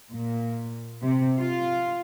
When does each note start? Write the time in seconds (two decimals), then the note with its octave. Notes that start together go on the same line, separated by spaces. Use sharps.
0.10 A#2
1.03 C3
1.39 F4